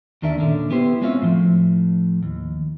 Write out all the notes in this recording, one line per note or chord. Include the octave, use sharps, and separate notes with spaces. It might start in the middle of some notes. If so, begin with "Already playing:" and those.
D#2 D#3 D4 A#4 E5
A#2 D3 C#4
B3 E4 G4 C5
G#3 C4 C#4 F4 C#5 E5
A2 F3
D#2